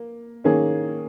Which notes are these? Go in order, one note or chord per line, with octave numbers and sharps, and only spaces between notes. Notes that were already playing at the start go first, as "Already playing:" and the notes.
Already playing: A#3
D#3 A#3 C#4 G#4